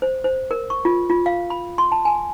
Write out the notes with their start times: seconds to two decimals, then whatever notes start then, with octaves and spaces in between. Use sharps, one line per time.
0.02 C5
0.24 C5
0.51 A#4
0.70 C#6
0.85 F4
1.10 F4
1.26 F5
1.50 B5
1.78 C6
1.92 A5
2.05 G#5